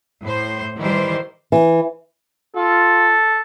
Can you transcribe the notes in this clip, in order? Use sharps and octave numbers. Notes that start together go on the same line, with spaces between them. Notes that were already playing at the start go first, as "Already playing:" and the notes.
A2 C5
D#3 E3 G3 G4 C5
E3
F4 A4